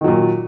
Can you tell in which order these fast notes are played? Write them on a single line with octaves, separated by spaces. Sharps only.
D#3 F#3 A#2